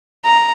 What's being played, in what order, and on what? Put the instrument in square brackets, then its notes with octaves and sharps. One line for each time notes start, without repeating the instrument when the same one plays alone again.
[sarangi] A#5